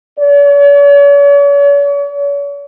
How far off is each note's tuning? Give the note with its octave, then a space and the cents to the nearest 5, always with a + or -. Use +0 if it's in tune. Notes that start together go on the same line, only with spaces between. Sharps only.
C#5 +45